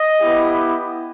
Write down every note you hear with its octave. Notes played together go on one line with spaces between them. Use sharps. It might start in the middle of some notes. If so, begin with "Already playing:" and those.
Already playing: D#5
B3 E4 G4